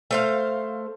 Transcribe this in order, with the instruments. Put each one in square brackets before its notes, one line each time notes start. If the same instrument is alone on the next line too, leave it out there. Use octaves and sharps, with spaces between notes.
[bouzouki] A3 C5 F5